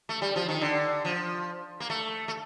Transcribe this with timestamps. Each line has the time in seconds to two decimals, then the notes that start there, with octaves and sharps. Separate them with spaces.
0.09 A3
0.22 G3
0.36 F3
0.48 D#3
0.61 D3
1.05 F3
1.80 A#3
1.90 A3
2.28 A3